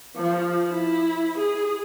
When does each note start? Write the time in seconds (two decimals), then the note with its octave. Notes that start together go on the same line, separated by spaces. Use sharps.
0.17 F3
0.70 E4
1.38 G#4